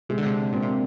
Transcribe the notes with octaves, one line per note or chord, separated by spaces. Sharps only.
C3 G#3
D3
C3
A#2 C4
C3